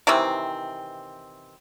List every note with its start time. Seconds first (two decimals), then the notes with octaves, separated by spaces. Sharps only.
0.07 C3 D#3 E3 C4